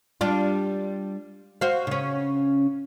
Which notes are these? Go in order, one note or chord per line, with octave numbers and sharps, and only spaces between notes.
G3 D4 F4
F#4 C5 F5
C#3 C#4